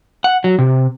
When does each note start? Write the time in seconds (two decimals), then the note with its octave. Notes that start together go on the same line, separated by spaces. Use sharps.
0.24 F#5
0.44 F#3
0.59 C3